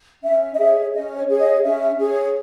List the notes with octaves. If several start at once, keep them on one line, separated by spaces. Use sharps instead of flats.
C#4 E5
D#5
G#4 C#5 E5
C#4 D#5
C#5
G#4 C#5
D#5
C#4 E5
G#4 C#5